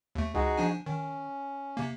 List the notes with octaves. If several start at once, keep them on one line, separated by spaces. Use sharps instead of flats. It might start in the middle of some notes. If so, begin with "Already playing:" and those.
D#2 A3
C#2 D#4 F#4 G#4
F3 D4 G#5
D#3 C#4
C3 A#3